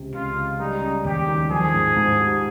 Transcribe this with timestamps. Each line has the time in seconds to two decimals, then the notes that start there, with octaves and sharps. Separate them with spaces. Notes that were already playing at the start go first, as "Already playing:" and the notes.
Already playing: C#2 C3
0.14 C#2 F4
0.37 C#2
0.60 G3 D#4
0.82 C#4
1.05 D#2 G4
1.28 D#3
1.51 F3 G#4
1.74 G#2
1.96 G#2
2.19 G4